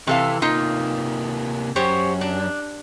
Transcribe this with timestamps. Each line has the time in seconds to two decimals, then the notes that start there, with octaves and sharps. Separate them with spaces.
0.07 C3 E3 A4 F5
0.42 C3 A#3 D#4 F4
1.76 F#2 G4 C5 C#5
2.21 D4